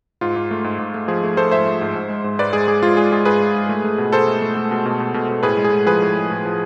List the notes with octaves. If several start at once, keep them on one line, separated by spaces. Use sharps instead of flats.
G#2 F4
G#2
A3
G#2
G#2
A3
F3 G#4
A3
A3 A4 C5
G#2 C5 E5
A3
G#2
G#2
G#3
G#2
G#2 B4 D5
G#3 G#4
G#3 G#4
G#3 F4
G#3 G#4
G#3 G#4
G#2 G#4 B4
G#3
G#2
A3
A3
B2
B2 A4 C5
A3
A3
A3
B2
B2
B2
B2
B2
A2 G#4 B4
G#3
G#4
A2
F3 G#4 B4
A2
A2
A2
F3